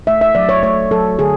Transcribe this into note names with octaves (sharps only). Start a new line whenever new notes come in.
A3 E5
E5
F#3 D5
C#5
A3 C#5
F#3 A4
D3 G#4